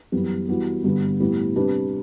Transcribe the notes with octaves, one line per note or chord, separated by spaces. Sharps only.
F#2 E3 G3 B3
E3 G3 B3 F#4
G2 D3 G3 B3
A2 G3 B3
C3 G3 D4 G4 B4